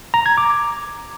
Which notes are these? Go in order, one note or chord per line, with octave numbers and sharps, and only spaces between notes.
A#5
G#6
D6